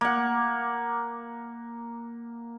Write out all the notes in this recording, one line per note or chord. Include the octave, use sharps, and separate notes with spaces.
A#3 F#5